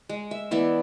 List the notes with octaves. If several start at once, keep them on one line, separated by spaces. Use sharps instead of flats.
G#3
E5
E3 B3 D5 E5